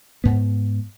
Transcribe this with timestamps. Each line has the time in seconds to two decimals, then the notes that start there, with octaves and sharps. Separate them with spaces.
0.24 G#2 B3